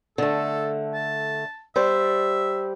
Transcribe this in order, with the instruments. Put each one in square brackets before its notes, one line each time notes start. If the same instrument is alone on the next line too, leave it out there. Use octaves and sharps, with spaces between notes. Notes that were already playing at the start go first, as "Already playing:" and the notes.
[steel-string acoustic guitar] D3 A3 [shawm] A4
[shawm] A5
[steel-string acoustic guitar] G3 C5 [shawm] E5